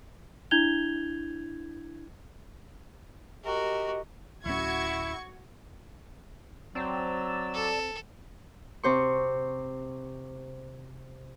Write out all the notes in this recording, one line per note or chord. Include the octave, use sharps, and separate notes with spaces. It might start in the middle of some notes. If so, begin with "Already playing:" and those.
D4 E4 G6 G#6 F7 G7
F#4 G4 A#4 D#5
D1 C#4 E4 F#4 C#6 G#6
F#3 C4 D5 A5 E6
A4
C3 C5 C#6